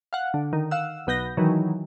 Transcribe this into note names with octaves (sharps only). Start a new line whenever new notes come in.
F5 F#5
D3
D#3
F5 F#5 E6
B1 B3 G6 A#6
D#3 E3 F#3